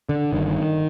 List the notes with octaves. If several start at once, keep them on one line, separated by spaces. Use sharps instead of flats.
D3
G1 G2 D3 D#3